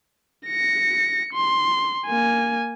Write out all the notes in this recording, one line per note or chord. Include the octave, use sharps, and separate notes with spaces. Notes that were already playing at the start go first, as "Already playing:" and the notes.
A#6 C#7
C6
A#3 G#5